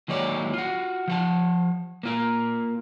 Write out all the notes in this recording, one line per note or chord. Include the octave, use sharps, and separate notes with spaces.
D#2 F#3 G#3 C#5 D5
F4 F#4
F3 F#5 A5
A#3 F4 A#4